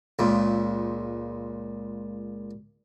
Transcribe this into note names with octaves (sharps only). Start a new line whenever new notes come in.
C#2 A#2